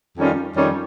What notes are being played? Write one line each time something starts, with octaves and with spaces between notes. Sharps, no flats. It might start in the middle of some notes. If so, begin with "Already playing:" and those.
F2 D#3 G3 C#4 F4
F2 D#3 G3 C#4 F4